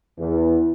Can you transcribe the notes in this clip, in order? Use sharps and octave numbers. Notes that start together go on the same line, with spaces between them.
E2